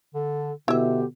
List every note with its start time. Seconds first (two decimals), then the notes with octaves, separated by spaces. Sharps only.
0.15 D3 A4
0.68 B2 D3 E4 G4 E5